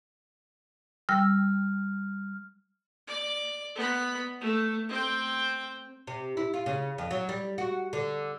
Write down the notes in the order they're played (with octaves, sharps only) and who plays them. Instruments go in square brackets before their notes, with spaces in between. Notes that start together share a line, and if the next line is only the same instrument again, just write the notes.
[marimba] G3 G5 E6 [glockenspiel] F6
[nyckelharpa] D5
B3 B5
A3
C4 G5
[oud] C3
E4
F4
C#3
F2
F#3
G3
F#4
D3